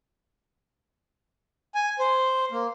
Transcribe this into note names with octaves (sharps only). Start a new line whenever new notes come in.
G#5
C5
A#3